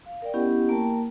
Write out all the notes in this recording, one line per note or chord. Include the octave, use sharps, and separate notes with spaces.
F5
A#4 D5 G5
B3 C#4 E4 G4 D#5 F#5
A#3 A#4 G5 A5